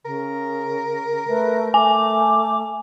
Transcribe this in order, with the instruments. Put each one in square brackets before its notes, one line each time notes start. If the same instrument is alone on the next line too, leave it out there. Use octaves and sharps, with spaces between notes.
[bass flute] C#3 [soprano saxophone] A#4
[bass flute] A3 [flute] B4
[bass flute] A3 [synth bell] G#5 [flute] D6